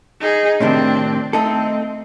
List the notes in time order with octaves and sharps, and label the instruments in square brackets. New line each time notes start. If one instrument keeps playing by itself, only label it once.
[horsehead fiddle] D#4 G#4
[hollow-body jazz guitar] A2 C3 D#3 [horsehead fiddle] C4 D4
[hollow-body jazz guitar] A3 D#4 A4 [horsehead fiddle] C4